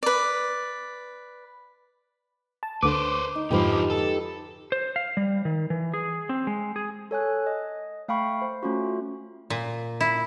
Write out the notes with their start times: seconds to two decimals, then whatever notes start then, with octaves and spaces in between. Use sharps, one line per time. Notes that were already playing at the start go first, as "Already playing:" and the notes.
0.03 B4 D5
2.63 A5
2.83 D2 D3 B4 C5 D6
3.35 D#4
3.51 F2 G#2 D3 F3 F4 G4 B4
3.90 A4
4.72 C5
4.96 F5
5.17 G3
5.45 D#3
5.70 E3
5.94 G#4
6.29 C4
6.47 G#3
6.76 G#4
7.11 A4 C#5 G#5 F#6
7.46 D#5
8.08 A3 F5 G5 B5 C#6
8.42 C5
8.63 A3 C#4 F4 F#4
9.50 A#2
10.00 E4